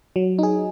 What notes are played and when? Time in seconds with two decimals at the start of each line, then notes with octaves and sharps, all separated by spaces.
0.16 F#3
0.39 D#4 G#4